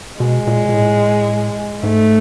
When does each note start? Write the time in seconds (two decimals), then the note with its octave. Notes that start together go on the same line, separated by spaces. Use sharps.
0.20 B2 G#3
0.47 A#2
0.69 A#2
0.74 A2
1.83 G#2 A3